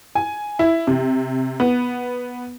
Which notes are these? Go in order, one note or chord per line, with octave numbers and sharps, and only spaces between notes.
G#5
E4
C3
B3